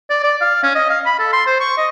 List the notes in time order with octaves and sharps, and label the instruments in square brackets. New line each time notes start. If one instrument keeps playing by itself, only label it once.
[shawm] D5
D5
F5
C#4
D#5
F5
B5
A4
C6
C5
C#6
D#5